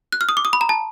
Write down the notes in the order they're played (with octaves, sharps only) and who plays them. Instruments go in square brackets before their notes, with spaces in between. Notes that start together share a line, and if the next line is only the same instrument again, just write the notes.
[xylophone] F#6
F6
D#6
D6
D#6
B5
A#5
A5